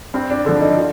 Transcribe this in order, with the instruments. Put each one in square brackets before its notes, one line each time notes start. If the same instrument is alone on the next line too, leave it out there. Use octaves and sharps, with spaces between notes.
[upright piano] G2 C4
D4
D3 F3 D4
D#4
F4